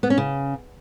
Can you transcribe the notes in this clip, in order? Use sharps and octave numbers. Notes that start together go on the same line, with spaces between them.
B3
C#4
C#3